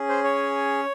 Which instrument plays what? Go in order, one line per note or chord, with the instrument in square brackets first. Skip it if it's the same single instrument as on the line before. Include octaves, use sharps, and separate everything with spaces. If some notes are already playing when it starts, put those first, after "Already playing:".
Already playing: [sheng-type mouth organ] C#4 G#4
C5
C#5